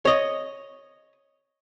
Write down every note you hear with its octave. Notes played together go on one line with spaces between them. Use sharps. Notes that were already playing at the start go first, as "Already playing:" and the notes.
C#5 D#5